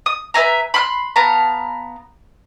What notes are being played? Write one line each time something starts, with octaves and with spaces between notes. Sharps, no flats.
D#6
B4 E5 G#5 A#5
B5 C6 F6 F#6
B3 F5 A5 A#5